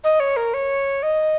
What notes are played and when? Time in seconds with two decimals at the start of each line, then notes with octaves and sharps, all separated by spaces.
0.04 D#5
0.20 C#5
0.37 A#4
0.54 C#5
1.03 D#5